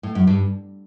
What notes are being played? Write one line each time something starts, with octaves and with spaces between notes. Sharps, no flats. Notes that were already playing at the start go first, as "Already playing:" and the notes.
A2
F#2
G2